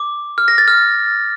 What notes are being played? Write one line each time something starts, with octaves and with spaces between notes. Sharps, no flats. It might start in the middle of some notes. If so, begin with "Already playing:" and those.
Already playing: D6
F6
A#6
A6
F6